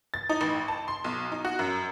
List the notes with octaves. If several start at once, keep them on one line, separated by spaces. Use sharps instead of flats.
A6
D#4
A1
A5
C6
B1
D#4
F#4
F#2